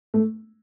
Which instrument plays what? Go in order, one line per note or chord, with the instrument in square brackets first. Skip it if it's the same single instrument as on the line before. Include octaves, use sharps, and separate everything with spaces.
[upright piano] A3